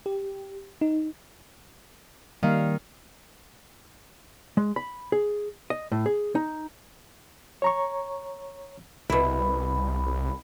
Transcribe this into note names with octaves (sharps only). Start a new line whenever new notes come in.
G4
D#4
D#3 G3 A#3 F5
G#3
B5
G#4
D#5
A2
G#4
D#4
C#5 A#5 C#6
C2 B2 E4 B5